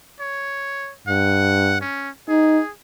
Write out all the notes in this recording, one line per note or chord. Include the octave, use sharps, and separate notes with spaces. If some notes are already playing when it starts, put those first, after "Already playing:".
C#5
G2 F#5
C#4
D#4 G#4